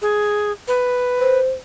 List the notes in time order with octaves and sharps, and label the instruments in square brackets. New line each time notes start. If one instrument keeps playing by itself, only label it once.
[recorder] G#4
B4
[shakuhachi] C5